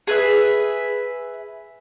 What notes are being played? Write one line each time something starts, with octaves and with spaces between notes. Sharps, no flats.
G#4 B4 E5